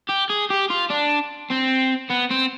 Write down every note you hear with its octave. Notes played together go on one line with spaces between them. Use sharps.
G4
G#4
G4
F4
D4
C4
B3
C4